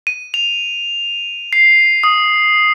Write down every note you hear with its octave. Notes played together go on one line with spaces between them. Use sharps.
D#7
F7
C7
D#6